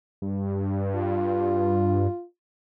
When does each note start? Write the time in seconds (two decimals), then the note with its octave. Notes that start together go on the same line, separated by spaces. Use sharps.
0.22 G2
0.96 F4